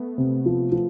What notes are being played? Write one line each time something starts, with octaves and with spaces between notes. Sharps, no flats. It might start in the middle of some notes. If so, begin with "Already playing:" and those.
Already playing: A3 B3
C3
F3
F3